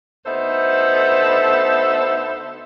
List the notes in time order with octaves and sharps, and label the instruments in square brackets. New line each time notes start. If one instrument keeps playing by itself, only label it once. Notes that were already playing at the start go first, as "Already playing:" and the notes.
[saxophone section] D2 B3 D#4 A4 C5 E5